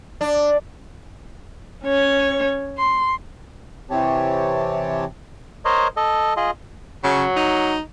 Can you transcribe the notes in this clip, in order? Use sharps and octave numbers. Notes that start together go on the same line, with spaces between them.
D4
C#4 C#5
C6
C3 E3 C4 G4 C#5 A5
A#4 C5 C#5 D#5
A4 D#5
F4 G#4 D#5
C#3 F#3
D#4